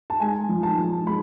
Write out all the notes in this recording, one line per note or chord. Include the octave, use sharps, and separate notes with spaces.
A5
G#3 G#5
F3
A5
F3
G#3 B5